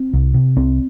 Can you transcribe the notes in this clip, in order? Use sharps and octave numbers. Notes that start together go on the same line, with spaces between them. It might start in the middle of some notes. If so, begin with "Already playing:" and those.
Already playing: C4
C2
C3
C2 C4